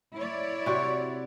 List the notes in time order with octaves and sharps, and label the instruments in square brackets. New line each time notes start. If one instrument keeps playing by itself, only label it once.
[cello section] E4 C#5 D5
[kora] C3 F#4